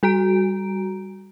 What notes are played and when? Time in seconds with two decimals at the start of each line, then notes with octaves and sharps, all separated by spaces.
0.03 G3 F#4 A#5 D7